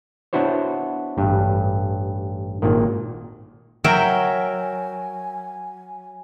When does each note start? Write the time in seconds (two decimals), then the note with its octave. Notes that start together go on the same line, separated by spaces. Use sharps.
0.33 B3 D4 E4 F#4 C5 C#5
1.18 A1 G2
2.62 G#1 A#2 D#3
3.84 F#3 A#4 E5 G5 G#5